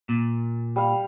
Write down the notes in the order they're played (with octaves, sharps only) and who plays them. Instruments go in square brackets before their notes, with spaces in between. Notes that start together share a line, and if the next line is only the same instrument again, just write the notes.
[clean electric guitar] A#2
[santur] G3 F5